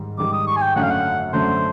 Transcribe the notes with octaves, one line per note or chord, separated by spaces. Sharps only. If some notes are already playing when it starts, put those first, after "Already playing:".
Already playing: G#2 D#3 G3
G#2 D#3 G3 D6
D#6
C#6
G#5
G5
F#2 D3 F#3 A3 F#5
F5
F#5
F#2 D3 F#3 A3 C5